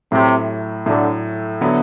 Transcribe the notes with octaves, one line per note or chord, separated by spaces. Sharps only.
A2 C3 F#3 A3
A2 D3 F#3 A3
D3 F#3 B3 E4